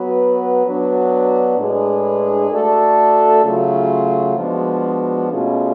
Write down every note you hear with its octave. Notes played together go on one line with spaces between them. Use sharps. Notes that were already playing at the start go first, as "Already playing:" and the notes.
Already playing: F#3 B3 F#4 B4
F#3 B3 D4
A2 G#3 D4 G#4 B4
A3 D4 F#4 A4
C#3 F#3 A3 F4 G#4
F3 G#3 B3 D4 F#4
B2 A3 C#4 F4 G#4